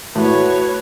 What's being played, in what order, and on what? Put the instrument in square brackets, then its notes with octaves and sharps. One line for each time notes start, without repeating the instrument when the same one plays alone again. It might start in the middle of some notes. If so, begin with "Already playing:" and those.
[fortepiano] A2 [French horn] F#4 [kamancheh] B4 C#5